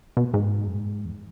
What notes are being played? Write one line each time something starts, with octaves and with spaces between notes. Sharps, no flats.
B2
G#2
F#2
G#2
E2